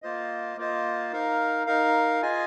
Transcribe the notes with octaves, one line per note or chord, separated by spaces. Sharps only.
A#3 F4 C5 D#5
A#3 F4 C5 D#5
D#4 A#4 F5
D#4 A#4 F5
F4 G#4 D#5 G#5